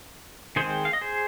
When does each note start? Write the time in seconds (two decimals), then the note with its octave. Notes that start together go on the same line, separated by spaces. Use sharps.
0.56 D#3 G#3 C4 G#4 C5
0.85 F5
0.93 D#5
1.01 G#4 C5